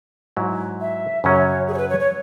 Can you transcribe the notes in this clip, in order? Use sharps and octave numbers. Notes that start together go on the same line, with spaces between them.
G#2 F#3 E4
E5
F#2 C#3 F#3 C#4 C#5
G#4
C#5
B4
C#5
C#5